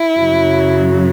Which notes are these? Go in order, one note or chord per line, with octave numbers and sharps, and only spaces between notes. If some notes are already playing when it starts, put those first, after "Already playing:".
Already playing: E4
F#2 C#3 F#3